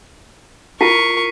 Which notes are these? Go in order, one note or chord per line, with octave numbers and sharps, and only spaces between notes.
E4 F4 A#4 C#6 B6 C7 D#7